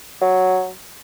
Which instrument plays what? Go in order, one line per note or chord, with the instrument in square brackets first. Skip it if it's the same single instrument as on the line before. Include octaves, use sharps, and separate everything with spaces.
[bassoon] F#3